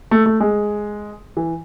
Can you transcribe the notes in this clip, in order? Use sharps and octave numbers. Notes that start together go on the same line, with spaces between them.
A3
A3
G#3
E3